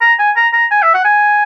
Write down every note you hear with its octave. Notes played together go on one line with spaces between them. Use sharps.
A#5
G#5
A#5
A#5
G#5
E5
F#5
G#5